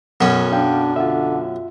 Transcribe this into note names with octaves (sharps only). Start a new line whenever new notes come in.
B1 F#2 C#4 A#4
D4 F5 G5
D3 F4 E5